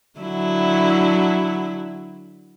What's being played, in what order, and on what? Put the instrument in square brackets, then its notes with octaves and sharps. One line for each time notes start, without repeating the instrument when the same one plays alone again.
[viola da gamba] D3 F#3 E4